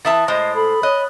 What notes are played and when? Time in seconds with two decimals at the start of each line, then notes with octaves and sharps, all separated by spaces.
0.05 E3 E5 A5 D#6 A6
0.28 A2 G#3 C5 D#5
0.55 A4 B5
0.83 C#5 D#5 F#6